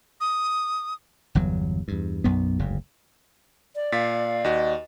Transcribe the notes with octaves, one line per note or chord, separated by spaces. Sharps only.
D#6
G1 E2 F#3
E2 G2
B1 F#2 B3
F#1 D2 G#2
D5
A#2 F5 A6 B6
D#2 F#4 D#5